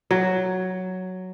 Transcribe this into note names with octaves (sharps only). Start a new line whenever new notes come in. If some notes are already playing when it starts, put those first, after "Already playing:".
F#3